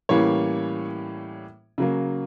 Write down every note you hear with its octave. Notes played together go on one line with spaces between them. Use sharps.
A2 E3 G3 A#3 C#4 C#5
C#3 F#3 A#3